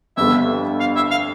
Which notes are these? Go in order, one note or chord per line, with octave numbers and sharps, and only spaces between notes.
G1 F2 D3 G3 B3 E5
F5
E5
F5